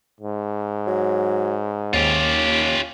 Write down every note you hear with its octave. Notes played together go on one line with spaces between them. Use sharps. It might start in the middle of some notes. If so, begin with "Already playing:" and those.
G#2
F#3
D#2 C#4 F4 G4